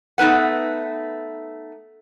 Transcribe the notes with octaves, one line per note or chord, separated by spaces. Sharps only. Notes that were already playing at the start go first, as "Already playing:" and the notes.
A3 B3 D#4 B4 F#5